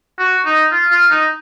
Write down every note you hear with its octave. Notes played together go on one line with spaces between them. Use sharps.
F#4
D#4
F4
F4
D#4